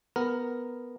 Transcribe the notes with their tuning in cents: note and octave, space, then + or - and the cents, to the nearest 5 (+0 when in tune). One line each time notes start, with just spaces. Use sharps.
B3 +0 A#4 +0